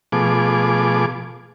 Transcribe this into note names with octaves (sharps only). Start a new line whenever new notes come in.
B2 F3 A3 G#4 D6